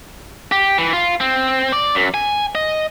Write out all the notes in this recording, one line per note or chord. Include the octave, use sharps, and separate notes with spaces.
G4
E3
F4
C4
D5
F#2
G#5
D#5